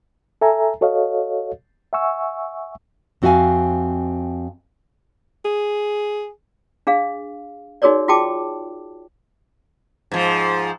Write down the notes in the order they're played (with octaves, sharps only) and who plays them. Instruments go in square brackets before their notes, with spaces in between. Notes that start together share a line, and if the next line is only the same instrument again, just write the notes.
[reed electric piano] A4 E5 G#5 A#5
F#4 A4 C#5 D#5 F5
E5 F#5 G#5 C#6 E6
[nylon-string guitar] F2 C4 F#4 E5 F5 G#5
[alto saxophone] G#4
[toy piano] D4 G#4 F5
D#4 F#4 G#4 A#4 C#5 D5
F4 F#4 G#4 G5 A5 D6
[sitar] G#2 F3